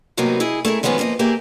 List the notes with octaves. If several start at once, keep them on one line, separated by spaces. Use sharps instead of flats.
A2 C3 F#3 A#3 B3 D#4
E4 G#4 D#5
A3 E4 G#4 A#4
D#3 F3 G#3 B3 C#4 G#4
F3 A#3 A#4 D#5
A#3 G4 G#4 E5